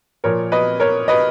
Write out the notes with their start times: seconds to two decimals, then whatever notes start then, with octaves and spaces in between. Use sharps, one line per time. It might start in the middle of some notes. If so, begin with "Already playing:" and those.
0.24 A#2 F3 A#4 C#5
0.52 B4 D#5
0.80 A#4 C#5
1.08 B4 D#5